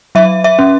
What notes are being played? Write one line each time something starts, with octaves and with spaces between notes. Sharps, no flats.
F#3 E5
E5
C#4